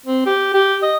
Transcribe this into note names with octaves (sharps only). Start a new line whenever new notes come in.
C4
G4
G4
D#5